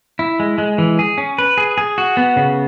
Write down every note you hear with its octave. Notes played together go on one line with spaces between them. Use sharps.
E4
G#3
G#3
E3
G#4
C#4
B4
G#4
G#4
F#4
B3
C#3